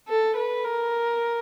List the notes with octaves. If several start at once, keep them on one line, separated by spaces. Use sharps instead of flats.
A4
B4
A#4